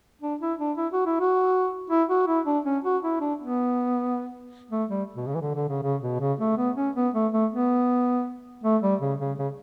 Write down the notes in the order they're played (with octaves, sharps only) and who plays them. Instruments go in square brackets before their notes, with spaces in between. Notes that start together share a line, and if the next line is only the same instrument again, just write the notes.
[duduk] D4
E4
D4
E4
F#4
E4
F#4
E4
F#4
E4
D4
C#4
F#4
E4
D4
B3
A3
G3
B2
C#3
E3
D3
D3
C#3
C#3
B2
C#3
A3
B3
C#4
B3
A3
A3
B3
A3
G3
C#3
C#3
C#3